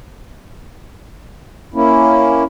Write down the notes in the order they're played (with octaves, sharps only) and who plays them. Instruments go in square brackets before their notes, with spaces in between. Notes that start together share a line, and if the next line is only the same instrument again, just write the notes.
[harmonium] A#3 C#4 E4